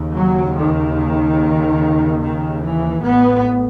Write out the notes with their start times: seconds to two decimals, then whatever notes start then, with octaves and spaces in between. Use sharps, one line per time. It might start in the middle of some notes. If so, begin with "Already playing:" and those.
Already playing: D#2 C#3
0.16 F#3
0.57 D#3
2.22 D#3
2.62 E3
3.03 A1 A2 B3